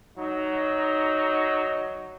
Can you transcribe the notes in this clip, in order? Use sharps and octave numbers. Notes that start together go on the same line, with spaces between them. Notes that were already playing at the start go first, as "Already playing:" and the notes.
F#3 D#4